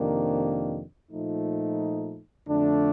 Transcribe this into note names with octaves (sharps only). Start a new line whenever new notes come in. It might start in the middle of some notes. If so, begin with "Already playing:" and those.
Already playing: F2 C3 D#3 A#3 D4
A#2 F3 A3 D#4
F2 D3 A3 D4